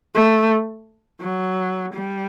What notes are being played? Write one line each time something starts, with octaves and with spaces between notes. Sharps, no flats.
A3
F#3
G3